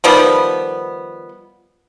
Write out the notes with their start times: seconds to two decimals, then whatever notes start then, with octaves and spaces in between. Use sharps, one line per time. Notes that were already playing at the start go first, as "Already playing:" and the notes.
0.04 D#3 F3 G3 B3